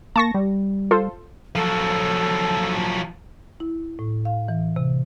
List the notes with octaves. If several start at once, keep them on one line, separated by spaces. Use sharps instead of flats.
A#3 A5 C#6 A#6
G3
F4 A4 C5
F3 F#3 A4
E4
A2
F5
E3
C3